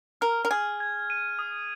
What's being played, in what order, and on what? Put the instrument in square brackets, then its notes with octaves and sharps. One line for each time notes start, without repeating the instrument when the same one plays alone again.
[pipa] A#4 [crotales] F6
[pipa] A#4
[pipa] G#4 [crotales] F6
[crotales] G#6
D#7
D#6